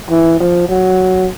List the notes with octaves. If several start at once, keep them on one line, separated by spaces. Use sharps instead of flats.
E3
F3
F#3